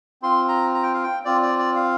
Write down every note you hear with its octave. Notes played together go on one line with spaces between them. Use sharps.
C4 F4 C6
A#5
A#5
G5
F5
G5
C4 F4 D5
D5
D5
F5